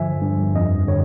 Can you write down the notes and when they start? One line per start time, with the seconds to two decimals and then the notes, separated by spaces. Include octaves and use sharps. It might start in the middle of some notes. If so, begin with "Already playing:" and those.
Already playing: G2 D3 F3 E5 G#5
0.22 G2
0.55 F2 D#5
0.88 D3 C#5